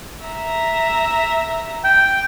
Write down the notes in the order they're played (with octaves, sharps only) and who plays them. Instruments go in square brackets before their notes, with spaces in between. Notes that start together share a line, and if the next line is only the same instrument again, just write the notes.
[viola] E5 A#5
[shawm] G5